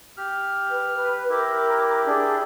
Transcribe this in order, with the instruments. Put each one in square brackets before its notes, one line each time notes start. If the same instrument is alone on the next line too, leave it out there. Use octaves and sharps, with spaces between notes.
[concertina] G4 F6
[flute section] B4
B4
[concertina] E4 G4 [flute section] A#4 D6
[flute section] D4 G#4